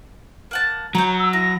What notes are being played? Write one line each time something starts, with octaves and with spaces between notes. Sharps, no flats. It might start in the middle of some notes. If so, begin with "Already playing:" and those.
A#3 F#5 A5
F#3 A#5 G6
E6
E4 A#6